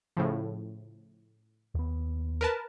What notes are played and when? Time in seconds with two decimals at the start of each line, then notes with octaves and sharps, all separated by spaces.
0.17 A2 C#3 F3
1.75 D#2 B3
2.41 A#4 B4 A5